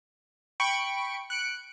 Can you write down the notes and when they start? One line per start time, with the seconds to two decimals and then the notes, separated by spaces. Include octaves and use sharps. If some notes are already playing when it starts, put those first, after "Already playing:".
0.60 G5 B5 C#6 C#7 D7
1.30 F#6 C#7 D7